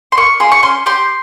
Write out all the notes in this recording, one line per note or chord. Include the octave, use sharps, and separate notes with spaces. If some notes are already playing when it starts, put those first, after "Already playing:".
C6
A#3 C#6
F4 G#4 C6
C#6
C#4 C6
G4 C6